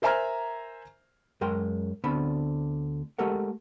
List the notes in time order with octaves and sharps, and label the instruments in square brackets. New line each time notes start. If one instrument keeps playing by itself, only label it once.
[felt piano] A#4 C5 E5 G#5 A#5 F6
[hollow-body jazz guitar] F#2 G#3 A#4 G5 C6
D2 D3 B3 C4 A5 B5
G#3 A3 G4 A4 A#4 F#5